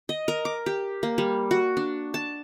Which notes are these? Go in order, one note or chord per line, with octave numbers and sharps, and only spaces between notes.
D#5
A#4
D6
G4
A#3
G3
F#4
D4
A5